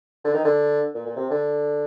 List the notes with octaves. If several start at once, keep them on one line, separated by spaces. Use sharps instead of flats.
D3
D#3
D3
A#2
A#2
C3
D3